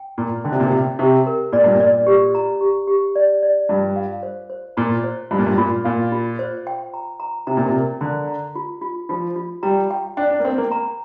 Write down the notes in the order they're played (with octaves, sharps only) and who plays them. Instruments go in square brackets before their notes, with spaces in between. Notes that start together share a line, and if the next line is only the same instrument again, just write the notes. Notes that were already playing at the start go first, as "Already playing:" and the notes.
Already playing: [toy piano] G5
[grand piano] A#2 [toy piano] A#5
[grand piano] D3 [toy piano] G5
[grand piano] C3
A#2
C3
[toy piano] G5
[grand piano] C3 [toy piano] G4
[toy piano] A#4
[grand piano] A#2 [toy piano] D5
[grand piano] G2
A#2
[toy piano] D5
G4
A#5
G4
G4
D5
D5
[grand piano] G2 [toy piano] F4
[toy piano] F5
C5
C5
[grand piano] A#2 [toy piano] A#5
[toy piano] C5
[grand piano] G2 [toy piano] F4
[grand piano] A#2
G2
[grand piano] A#2 [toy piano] F4
[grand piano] A#2 [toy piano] F5
[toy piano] F4
C5
G5
A#5
A#5
[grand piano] C3 [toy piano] A#5
[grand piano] A#2
C3
[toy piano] A#4
[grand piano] D3 [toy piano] A#5
[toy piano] A#5
F4
F4
[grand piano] F3 [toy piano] F4
[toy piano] F4
[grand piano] G3 [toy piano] A#5
[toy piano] G5
[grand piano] D4 [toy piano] G5
[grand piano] D4
A#3
[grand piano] C4 [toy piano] G5
[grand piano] A#3
[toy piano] A#5